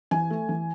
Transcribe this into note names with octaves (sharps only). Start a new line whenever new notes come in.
E3 G#5
A3
E3